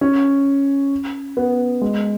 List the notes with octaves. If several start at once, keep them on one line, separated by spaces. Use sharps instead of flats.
C#4
B3
G#3